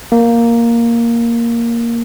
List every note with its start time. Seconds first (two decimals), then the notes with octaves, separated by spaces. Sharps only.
0.12 A#3